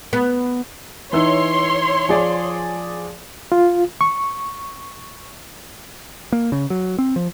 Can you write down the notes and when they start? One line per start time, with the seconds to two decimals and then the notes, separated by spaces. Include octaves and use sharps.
0.13 B3
1.13 E3 D#4 C#5 C6 E6
2.09 F3 G#4 D5
3.52 F4
4.01 C#6
6.32 A#3
6.52 C#3
6.70 F#3
6.98 C4
7.16 F3